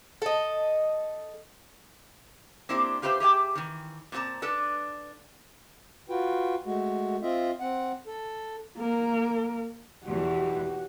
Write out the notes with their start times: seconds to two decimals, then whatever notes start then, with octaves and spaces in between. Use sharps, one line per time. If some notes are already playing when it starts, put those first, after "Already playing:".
0.22 A4 D#5
2.69 A#3 C4 D4 E4 G4 C5
3.02 F4 G4 B4 C5 E5
3.20 G4 G#4 E5 G5
3.55 D#3 E3
4.12 A#2 C4 F#4 A5 A#5
4.42 D4 A4 B4 A5
6.10 F4 F#4 B4 G5
6.65 G#3 A3 F#4
7.22 C4 F4 D#5 E5
7.60 C4 F#5
8.07 A4
8.77 A#3 A#4
10.05 E2 B2 E3 F#4 G4